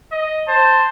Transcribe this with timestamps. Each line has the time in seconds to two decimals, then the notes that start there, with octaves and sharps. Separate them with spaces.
0.11 D#5
0.48 C5 A5